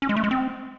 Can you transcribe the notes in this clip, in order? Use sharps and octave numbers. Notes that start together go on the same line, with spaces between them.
C#4
G#3
A3
G#3
C4